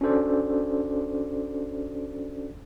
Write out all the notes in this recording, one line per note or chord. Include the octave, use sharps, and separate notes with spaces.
C#4 D4 F#4 A4 C5 D5